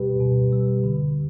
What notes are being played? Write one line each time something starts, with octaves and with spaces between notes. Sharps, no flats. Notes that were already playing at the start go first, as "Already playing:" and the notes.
Already playing: B2 G3 G4 B4
B2
G3
D3